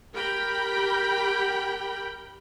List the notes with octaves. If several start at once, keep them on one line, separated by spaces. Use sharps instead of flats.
G4 A#4 G5 B5